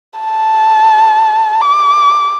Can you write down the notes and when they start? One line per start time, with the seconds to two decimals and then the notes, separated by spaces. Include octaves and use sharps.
0.18 A5
1.61 D6